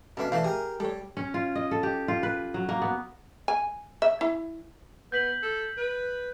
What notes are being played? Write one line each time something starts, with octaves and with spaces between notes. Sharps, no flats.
B2 D3 C#4 D4 E5 F5
E3 A3 D5 F5 A5
G4 G#4 A#4
G3 A4 C#5
C#4
F4
D#5
A4
G4
F4
B4
F#3
A#3
B3
G#5
E5
E4
B3 G6 B6 F#7
A4
B4